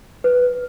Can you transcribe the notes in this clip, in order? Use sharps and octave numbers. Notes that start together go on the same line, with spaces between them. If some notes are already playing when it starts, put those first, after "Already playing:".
B4